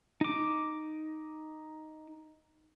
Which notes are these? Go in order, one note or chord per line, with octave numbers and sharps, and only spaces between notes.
D#4 D6